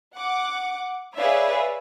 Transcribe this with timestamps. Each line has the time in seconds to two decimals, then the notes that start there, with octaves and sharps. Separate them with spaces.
0.16 F#5 D6
1.18 G#4 B4 C#5 D5 E5 F5